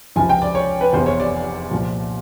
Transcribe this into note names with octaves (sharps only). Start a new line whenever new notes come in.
C#2 C3 F3 G#5
G5
D5
C#5
B4
F1 E2 C3 C5
C#5
D5
C2 A#2 F3